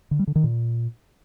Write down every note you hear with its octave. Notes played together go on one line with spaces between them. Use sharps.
D3
G3
D3
D#3
A#2